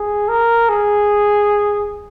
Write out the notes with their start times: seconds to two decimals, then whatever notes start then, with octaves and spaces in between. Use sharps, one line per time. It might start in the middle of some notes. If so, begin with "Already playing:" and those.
Already playing: G#4
0.28 A#4
0.69 G#4